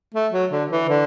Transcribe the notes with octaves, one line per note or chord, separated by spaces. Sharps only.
A3
F#3
D3
E3
D3